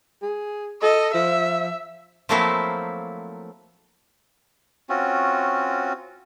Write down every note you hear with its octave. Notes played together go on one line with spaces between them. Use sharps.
G#4
A4 D#5
F3 E5
F3 F#3 A3 A#3 C4 E4
C4 C#4 F4 F#4